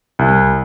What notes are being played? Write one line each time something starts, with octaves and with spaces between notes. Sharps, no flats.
C2